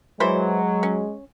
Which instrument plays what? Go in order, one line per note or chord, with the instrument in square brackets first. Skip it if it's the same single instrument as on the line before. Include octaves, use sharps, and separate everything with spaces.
[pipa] E3 E4 C5 [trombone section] F#3 [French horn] G#3
[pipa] C#4